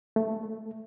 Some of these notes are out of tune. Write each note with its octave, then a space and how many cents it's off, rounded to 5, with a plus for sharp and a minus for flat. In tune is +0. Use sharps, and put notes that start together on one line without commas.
A3 +5